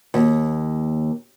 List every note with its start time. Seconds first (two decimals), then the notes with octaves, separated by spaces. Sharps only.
0.14 D#2